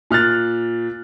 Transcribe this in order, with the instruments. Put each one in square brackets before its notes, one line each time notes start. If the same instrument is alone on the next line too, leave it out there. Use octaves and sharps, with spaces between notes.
[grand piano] A#2 F6 F#6 A6